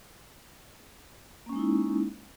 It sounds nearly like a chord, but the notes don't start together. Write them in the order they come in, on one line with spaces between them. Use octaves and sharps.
A#3 C#4 G#3 D#4 E4